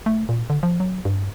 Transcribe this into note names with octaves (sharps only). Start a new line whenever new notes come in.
A3
A#2
D3
F3
F#3
G2